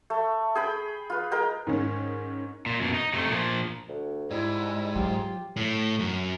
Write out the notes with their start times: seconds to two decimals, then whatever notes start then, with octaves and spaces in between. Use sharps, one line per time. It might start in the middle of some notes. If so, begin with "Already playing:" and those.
0.10 A3
0.55 G#4 G5 B5
1.10 F4 B4
1.31 G#3 A#4 G5 A#5
1.67 G#2 D#3 C#4
2.66 A#2
2.79 F#2 B2
2.94 D#4
3.13 C3 A3
3.29 A#2 F3
3.89 D2
4.31 G#2 G3 E4
4.95 F#3 F4 G4
5.56 A2
5.99 F#2